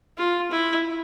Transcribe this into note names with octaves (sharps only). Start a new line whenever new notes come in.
F4
E4